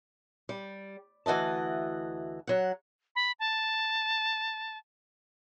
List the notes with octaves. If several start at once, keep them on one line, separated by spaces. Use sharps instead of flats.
G3
D2 E3 F#4 D#5 A5
F#3 F#5
B5
A5